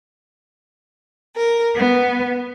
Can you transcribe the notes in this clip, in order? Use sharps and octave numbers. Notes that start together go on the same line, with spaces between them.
A#4
B3